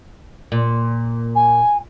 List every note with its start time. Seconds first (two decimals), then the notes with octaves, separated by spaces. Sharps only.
0.52 A#2
1.35 G#5